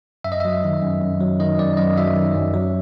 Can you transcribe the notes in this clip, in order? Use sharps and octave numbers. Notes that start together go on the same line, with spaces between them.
F#2 E5
D#5
F#3 E5
D#3
F#2
F#2
F#3
D#3 D#5
F#2 D5
F#2 D#5
F#3 E5
D#3
F#2
F#3